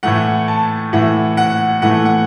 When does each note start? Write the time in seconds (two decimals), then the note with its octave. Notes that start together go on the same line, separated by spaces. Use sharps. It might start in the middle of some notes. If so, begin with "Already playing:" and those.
0.03 A2 E3 A3 F#5
0.48 A5
0.93 A2 E3 A3 F#5
1.37 F#5
1.82 A2 E3 A3 F#5
2.05 F#5